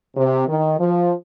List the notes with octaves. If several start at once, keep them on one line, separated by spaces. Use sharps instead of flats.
C3
D#3
F3